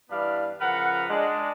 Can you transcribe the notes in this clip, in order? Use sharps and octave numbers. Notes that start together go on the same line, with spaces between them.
G2 E3 G3 B3 D4 F5
C#3 F3 A#4 B4 F#5
G#3 D4